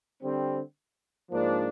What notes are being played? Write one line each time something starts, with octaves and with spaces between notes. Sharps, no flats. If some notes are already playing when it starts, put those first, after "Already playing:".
D3 G3 C4
G#2 F3 A#3 D4